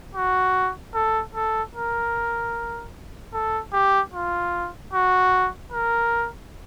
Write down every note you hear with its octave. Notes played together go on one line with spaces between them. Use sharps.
F#4
A4
A4
A#4
A4
G4
F4
F#4
A#4